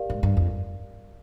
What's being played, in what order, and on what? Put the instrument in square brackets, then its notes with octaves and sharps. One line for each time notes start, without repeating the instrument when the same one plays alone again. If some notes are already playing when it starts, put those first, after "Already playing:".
Already playing: [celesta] G4 A#4 D5 F5
[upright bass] G#2
G2
F2